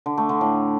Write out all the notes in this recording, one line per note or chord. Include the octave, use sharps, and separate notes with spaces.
D3
A3
D3
A2